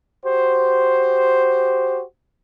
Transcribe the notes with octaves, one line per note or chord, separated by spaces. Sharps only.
F#4 G4 C5